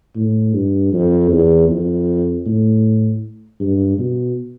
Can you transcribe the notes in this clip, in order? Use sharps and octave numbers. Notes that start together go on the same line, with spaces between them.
A2
G2
F2
E2
F2
A2
G2
B2